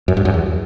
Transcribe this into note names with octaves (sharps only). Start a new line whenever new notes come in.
F#2
G2
F#2
E2